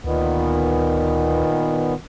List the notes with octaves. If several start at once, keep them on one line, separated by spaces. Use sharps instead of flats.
D2 A#2 D#3 B3